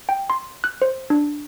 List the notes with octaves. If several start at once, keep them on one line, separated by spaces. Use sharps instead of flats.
G5
C6
F#6
C5
D4